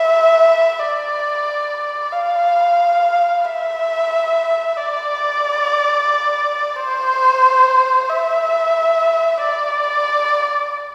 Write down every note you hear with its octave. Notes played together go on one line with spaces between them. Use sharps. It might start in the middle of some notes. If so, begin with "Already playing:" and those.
Already playing: E5
D5
F5
E5
D5
C5
E5
D5